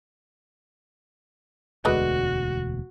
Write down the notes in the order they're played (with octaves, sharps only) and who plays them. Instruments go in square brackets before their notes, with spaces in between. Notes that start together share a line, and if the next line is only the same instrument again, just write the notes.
[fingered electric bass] E1 D2 B2 [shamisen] D3 G#3 B4 [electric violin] F#4